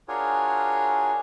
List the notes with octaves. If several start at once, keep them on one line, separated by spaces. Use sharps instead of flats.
D4 F4 F#4 G#4 A#4 C#5